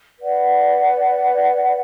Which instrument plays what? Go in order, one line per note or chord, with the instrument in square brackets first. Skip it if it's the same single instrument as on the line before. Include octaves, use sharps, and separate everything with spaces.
[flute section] B4 D5 F#5